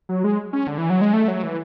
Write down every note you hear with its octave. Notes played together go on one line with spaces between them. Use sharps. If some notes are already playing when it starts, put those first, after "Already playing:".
F#3
G#3
C#4
D3
E3
F#3
G#3
A3
F#3
E3